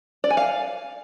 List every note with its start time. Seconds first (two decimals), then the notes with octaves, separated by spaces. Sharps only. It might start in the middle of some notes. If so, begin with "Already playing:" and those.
0.24 D5
0.30 G#5
0.37 F5